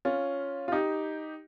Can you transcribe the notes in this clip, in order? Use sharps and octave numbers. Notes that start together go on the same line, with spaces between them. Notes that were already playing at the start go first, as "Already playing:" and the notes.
C#4 F4
F4
D#4 G4